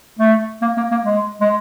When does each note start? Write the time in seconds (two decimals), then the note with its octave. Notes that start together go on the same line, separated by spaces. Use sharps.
0.19 A3
0.62 A#3
0.77 A#3
0.91 A#3
1.05 G#3
1.41 G#3